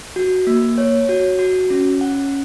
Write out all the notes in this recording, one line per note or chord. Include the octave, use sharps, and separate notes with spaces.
F#4
A#3
C#5
F#4
F#4
C#4
F#5